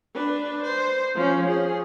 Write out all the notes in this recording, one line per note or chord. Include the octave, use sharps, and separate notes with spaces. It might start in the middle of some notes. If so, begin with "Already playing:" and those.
D4 B4
C5
F3 C#4
G#4